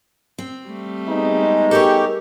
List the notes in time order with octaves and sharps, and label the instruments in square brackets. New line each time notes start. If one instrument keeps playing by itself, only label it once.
[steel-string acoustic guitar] C4
[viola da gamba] G3 A3
[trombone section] B3 D#4 G#4
[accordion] G#3
[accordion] G4 [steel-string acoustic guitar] A4 A#4 C#5